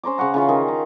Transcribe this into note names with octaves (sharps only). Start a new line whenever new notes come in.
C#4 C5 A#5 D6
C#3 C#5 F#5 A#5
C#3 E3 F4 F5
D#3 G#4
A#5